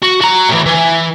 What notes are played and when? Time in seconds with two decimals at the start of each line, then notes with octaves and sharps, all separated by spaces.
0.02 F#4
0.21 F#4 A#5
0.49 A2 E3
0.66 E3